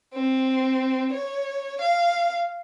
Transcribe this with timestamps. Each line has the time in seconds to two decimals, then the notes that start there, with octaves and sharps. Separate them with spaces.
0.14 C4
1.13 C#5
1.81 F5